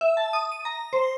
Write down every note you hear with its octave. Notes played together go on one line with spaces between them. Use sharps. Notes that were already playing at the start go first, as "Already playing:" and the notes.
E5
A5
D#6
D#7
A#5
C5